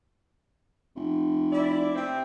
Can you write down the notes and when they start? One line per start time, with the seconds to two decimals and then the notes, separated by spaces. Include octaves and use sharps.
0.96 F1
1.52 E4 D5
1.95 C3 C4